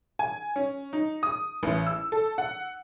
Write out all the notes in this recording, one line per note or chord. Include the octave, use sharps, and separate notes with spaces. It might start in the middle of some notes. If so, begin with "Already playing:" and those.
G#5
C#4
D#4
D#6
A1
E6
A4
F#5